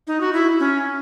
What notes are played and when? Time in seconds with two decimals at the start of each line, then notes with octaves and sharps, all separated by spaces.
0.07 D#4
0.21 F#4
0.33 E4
0.60 C#4